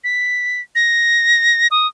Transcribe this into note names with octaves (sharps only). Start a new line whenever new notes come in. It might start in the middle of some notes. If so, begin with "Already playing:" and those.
B6
A#6
D#6